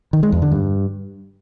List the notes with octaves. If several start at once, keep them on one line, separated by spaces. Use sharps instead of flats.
D#3
G#3
E2
D3
G2